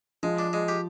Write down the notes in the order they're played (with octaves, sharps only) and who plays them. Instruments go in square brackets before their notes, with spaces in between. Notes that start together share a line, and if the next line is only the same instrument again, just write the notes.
[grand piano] F3 [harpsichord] G#3
[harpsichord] D4
G#3
G4